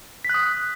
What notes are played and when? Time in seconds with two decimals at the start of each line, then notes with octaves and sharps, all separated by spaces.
0.25 B6
0.29 F#6
0.34 D#6